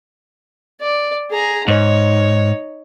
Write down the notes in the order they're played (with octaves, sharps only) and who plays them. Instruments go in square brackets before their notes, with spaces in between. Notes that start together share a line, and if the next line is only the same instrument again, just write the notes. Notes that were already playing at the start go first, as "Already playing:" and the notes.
[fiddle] D5
G#4 A#5
[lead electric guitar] G#2 [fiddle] D#4 C#5